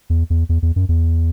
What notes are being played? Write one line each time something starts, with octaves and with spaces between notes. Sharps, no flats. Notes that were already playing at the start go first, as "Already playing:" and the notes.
E2
E2
E2
E2
F#2
E2